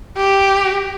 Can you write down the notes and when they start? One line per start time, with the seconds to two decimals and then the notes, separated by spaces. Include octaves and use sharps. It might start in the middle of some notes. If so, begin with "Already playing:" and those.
0.16 G4